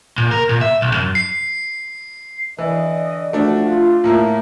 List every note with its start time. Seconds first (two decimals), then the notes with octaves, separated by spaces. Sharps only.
0.18 A#2
0.31 A#4
0.49 A#2
0.61 E5
0.82 B1
0.94 F#2
1.15 C7
2.58 D3 E3 D5 D#5
3.33 F3 A3 D4 F#4
3.67 F4
4.04 A2 A#3 E4